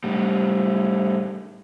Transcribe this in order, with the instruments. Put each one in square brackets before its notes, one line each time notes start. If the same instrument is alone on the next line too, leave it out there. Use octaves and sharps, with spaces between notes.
[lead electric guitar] A2 G3